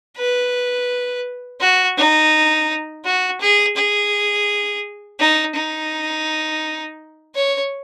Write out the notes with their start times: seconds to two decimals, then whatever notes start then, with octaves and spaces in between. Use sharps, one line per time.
0.17 B4
1.60 F#4
1.97 D#4
3.05 F#4
3.41 G#4
3.77 G#4
5.19 D#4
5.55 D#4
7.35 C#5